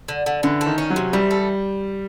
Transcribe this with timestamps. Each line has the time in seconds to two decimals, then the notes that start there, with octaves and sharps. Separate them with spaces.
0.08 D3
0.26 D3
0.43 D3 E3
0.61 A3
0.66 D#3
0.78 C#4
0.90 F#3
0.96 C3
1.13 E3 G3
1.31 A3